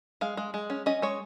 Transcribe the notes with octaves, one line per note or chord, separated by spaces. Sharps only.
G#3 F5
G#3
G#3
C#4
C#4 D#5
G#3 C#5